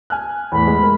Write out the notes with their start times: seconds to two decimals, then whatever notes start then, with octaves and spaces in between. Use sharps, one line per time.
0.10 G#5 F6 F#6
0.52 E2 A2 B5
0.67 G#3
0.83 A#4